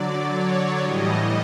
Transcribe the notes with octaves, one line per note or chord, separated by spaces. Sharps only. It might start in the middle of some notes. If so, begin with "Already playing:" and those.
Already playing: D3 F#3 D5
C#5
A2 E3 G3 D#5